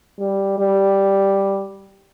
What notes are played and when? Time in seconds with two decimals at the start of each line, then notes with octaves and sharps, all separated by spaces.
0.19 G3
0.58 G3